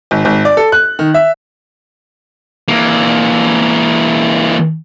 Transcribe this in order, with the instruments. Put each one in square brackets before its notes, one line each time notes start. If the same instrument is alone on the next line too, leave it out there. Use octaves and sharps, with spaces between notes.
[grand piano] G#1
G#1
D5
A4
F#6
D#3
E5
[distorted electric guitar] E3 A#3